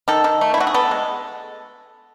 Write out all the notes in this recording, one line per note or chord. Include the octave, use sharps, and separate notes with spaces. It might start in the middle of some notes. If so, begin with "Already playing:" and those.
D#3 A4
D#3
A3
E4
A3 F#4
G#4
B3 A4
G#3